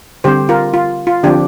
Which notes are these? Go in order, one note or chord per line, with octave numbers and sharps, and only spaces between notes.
D3 G3 C4 G4 C5
F4 A#4
F4
F4
D3 F3 C4 D4 G4